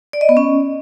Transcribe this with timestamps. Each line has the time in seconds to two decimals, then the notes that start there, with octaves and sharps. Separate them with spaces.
0.13 D5
0.21 D#5
0.29 B3
0.37 C#4